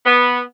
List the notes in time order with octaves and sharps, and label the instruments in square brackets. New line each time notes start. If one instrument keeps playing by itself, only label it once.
[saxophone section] B3